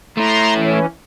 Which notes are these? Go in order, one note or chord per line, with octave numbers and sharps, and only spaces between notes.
A3 E4 A#5 C6
E3 C#4